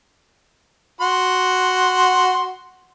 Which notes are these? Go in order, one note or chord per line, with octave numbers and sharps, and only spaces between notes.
F#4 F#5 C6